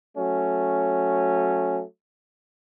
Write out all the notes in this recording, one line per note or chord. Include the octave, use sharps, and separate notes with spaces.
F#3 A3 C#4